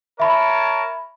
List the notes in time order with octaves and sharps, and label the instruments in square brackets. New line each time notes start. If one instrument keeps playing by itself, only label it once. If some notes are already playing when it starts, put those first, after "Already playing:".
[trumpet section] A#4 C#5 A5 [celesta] E5 B5